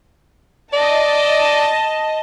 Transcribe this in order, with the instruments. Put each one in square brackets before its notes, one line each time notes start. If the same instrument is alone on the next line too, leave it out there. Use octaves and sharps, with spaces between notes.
[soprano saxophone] D5 [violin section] D#5 A5